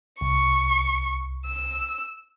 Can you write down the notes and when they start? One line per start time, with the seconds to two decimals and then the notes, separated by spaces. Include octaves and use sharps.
0.21 C2 C#6
1.47 E6